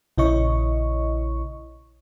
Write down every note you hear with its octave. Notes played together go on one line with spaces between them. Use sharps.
A#1 C#3 E4 C#5 D#5 C#6